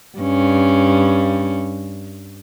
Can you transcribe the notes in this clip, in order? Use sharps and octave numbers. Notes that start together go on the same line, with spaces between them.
G2 C#4